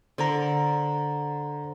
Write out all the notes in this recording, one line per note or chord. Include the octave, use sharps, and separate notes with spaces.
D3 A#4 C5 A#5